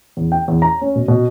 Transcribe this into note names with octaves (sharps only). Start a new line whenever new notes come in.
E2
G5
E2
A#5
C#4
B2
B2